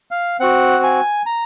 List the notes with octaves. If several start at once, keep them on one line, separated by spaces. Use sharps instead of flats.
F5
C4 F#4 F#5
G#5
A#5